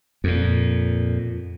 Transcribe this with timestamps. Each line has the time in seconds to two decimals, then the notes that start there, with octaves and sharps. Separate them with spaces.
0.24 F2 A#2